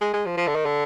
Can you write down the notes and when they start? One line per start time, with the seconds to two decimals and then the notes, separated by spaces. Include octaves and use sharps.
0.01 G#3
0.13 G#3
0.26 F3
0.37 F3
0.47 D3
0.55 D#3
0.65 D3